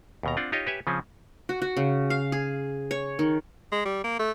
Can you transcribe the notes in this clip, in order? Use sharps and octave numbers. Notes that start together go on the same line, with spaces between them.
D#2 B2 A#5
C4 D4 F4 F#5
D#4 F4 G4 C#5 D#5
G4 B4 C#5 E5 G#5
C#3 F3 C4 C#4
F#4
F#4
C#3
F5
G#4
C#5
D#3
G#3
G3
A#3
A3